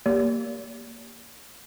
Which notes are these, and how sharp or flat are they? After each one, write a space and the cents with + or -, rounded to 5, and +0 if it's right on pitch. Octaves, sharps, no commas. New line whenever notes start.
A#3 +0 G4 +0 D5 -45